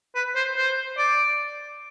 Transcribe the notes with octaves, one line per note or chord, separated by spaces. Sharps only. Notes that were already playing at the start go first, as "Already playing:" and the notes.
B4
C5
C5
D5